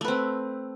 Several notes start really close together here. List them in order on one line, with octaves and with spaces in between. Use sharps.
A3 B4 C4